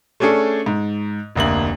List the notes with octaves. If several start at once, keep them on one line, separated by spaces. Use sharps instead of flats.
A3 C#4 D4 G#4 A4
G#2
F1 D2 A#3 F#7